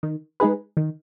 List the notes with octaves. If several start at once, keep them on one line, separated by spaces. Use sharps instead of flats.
D#3
G#3 D#4 G#4 B4
D#3